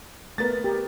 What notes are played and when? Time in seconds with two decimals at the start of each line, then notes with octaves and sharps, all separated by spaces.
0.38 A3 B3 A#4 A6
0.64 G4 A#4